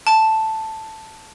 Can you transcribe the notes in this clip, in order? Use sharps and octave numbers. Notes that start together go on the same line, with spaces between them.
A5